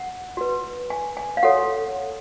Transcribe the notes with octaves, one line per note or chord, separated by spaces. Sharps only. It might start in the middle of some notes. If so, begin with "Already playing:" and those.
Already playing: F#5
F#4 B4
G#5
G#5
F5
F#4 A4 C#5 F#5